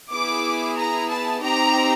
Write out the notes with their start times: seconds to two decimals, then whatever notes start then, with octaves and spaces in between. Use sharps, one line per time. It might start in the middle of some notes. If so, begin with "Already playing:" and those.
0.11 B3 E4 G#4 D6
0.76 A#5
1.08 A5
1.42 C4 D#4 G4 A#5